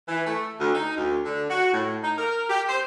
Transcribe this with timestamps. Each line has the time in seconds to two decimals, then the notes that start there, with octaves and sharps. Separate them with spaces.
0.09 E3
0.26 A3
0.59 D2
0.74 D#4
0.97 D2
1.24 D3
1.49 F#4
1.73 A2
2.03 D#4
2.18 A#4
2.49 G4
2.68 C5